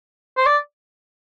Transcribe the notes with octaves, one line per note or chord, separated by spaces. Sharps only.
C5
D5